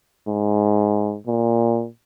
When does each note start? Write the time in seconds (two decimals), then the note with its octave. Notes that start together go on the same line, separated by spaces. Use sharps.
0.27 G#2
1.27 A#2